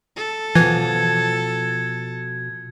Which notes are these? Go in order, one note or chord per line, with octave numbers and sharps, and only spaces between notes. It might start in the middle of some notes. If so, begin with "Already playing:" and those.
A4
B2 E3 F3 G#6